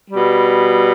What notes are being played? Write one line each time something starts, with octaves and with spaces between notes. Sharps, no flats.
B2 G3